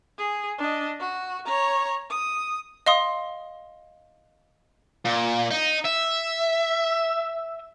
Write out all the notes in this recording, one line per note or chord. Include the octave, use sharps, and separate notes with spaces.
G#4
D4 D#5
F#4
C#5 A#5
D#6
D#5 F5 C6 D#6
A#2
D#4
E5